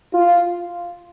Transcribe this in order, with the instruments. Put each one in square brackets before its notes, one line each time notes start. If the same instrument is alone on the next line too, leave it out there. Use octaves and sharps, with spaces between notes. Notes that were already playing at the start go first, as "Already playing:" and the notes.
[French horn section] F4